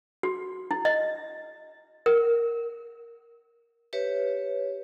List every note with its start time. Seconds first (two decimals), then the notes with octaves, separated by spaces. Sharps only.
0.23 F#4
0.71 E4
0.85 D#5
2.06 A#4
3.93 G4 B4 C#5 E5